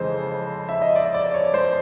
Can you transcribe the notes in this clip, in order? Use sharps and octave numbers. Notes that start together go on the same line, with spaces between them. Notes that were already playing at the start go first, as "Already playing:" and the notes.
Already playing: F2 C#3 E3 G#3 C5
E5
D#5
D5
D5
C#5
C5